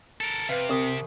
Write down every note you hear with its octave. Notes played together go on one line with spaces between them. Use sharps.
A4 A#4
C3 B4 F5
C2 C4 D#6